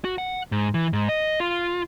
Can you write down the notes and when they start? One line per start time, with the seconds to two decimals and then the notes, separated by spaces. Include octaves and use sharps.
0.05 F#4
0.18 F#5
0.52 G#2
0.74 E3
0.93 G#2
1.09 D#5
1.40 F4